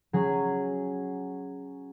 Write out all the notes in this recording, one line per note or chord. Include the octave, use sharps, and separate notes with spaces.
F#3 C#4 G#4